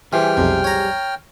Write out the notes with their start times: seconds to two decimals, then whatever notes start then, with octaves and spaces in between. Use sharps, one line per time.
0.13 E3 G3 G#4 C5 G5 F6
0.37 B1 F2 C3
0.64 C#5 A#5